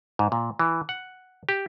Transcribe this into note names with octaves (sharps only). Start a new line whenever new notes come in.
G#2
A#2
E3
F#5
G4